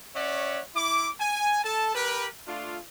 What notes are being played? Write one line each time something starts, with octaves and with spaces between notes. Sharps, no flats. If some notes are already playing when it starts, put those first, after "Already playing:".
C#4 C#5 D5 E5 F#5
E4 D6
G#5
A4 A5
G4 A#4 B4
A3 D4 F4